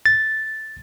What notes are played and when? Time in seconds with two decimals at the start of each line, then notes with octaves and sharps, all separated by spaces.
0.06 A6